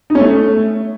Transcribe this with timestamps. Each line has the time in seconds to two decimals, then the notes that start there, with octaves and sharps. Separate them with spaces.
0.10 D#4
0.15 C#4
0.20 A3